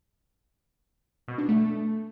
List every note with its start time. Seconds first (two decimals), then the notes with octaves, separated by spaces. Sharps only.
1.28 B2
1.38 D4
1.49 A3